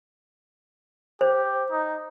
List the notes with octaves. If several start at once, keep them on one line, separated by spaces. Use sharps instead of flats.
G4 C5
D#4